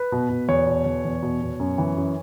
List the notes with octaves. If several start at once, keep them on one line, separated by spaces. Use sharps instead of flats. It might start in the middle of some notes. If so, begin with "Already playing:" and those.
Already playing: B4
B2
B2
E2 C#5
B2
E2
E2
B2
B2
F#2
E3
F#2